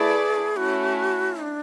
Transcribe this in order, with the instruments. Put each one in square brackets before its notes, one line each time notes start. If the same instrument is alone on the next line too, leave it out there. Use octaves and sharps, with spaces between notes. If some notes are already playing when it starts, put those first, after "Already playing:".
Already playing: [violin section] A3 E4 B4 D5 [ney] G#4
[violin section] A3 C#4 E4 [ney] F#4
[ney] D4